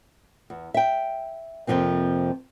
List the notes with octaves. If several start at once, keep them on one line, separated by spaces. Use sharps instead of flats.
E2
E5 G5
F2 C3 F3 A#3 C4